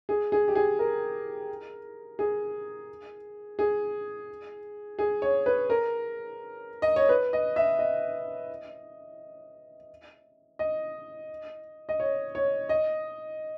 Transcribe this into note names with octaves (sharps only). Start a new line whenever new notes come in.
G#4
G#4
G4
G#4
A#4
G#4
G#4
G#4
C#5
B4
A#4
D#5
C#5
B4
D#5
E5
D#5
D#5
D#5
C#5
C#5
D#5